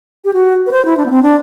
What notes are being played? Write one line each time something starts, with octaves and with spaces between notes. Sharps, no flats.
G4
F#4
B4
C5
E4
D4
B3
C4
D4